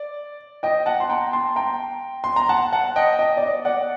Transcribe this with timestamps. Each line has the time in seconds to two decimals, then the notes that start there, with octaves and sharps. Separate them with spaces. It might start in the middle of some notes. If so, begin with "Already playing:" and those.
Already playing: D5
0.63 D#5 G5
0.86 F#5 A5
1.00 C6
1.10 G5 A#5
1.33 A5 C6
1.56 G5 A#5
2.24 C6
2.36 A#5
2.49 F#5 A5
2.72 F#5 A5
2.96 D#5 G5
3.19 D#5
3.37 D5
3.42 D#5
3.65 D5 F#5